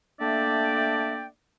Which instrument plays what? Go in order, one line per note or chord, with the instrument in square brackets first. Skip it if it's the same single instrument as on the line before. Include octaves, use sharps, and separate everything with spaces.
[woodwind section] A3 A#3 D4 D5 E5 G5